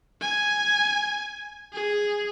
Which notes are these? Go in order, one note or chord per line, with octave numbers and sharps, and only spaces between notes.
G#5
G#4